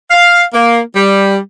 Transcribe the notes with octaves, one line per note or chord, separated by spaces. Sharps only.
F5
A#3
G3